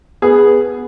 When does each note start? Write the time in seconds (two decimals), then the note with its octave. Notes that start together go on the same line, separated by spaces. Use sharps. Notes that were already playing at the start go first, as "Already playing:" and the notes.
0.22 B3 G#4